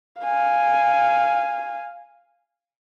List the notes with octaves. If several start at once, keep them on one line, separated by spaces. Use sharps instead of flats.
F5 G#5